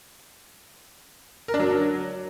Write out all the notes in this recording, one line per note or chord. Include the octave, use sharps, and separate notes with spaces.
A#4
D4
F#3